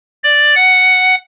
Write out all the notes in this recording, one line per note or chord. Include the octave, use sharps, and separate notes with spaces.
D5
F#5